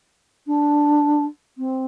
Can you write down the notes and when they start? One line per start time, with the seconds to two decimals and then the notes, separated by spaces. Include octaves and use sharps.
0.46 D4
1.57 C4